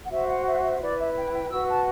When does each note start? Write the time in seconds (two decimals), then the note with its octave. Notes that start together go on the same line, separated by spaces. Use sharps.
0.04 F#5
0.10 F#4 C5 E5
0.28 F#5
0.45 E5
0.62 E5
0.80 E4 B4 D5
0.98 E5
1.16 G5
1.33 G5
1.50 F#4 B4 E6
1.68 A5